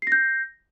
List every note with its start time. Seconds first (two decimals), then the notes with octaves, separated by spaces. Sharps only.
0.02 C7
0.07 A#6
0.12 G6